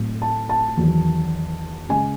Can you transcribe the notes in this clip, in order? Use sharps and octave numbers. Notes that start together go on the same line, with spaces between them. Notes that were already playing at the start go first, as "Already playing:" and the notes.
Already playing: A2 F#3 A3 C4
A5
A5
E2 D#3 F#3
C#3 G#3 C#4 G#5